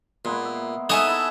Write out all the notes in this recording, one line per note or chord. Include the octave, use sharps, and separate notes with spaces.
A#2 G#3 A#3 B3
E5
D#4 A4 C#5 E5 F#5 G#5 D#6
E4 A5